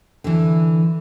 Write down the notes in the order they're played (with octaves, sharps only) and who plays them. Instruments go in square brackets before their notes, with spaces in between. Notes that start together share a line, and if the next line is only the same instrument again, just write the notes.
[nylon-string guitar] D3 E3